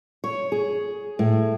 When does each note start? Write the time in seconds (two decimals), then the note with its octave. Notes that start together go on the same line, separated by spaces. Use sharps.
0.24 C#5
0.52 G#4
1.19 A2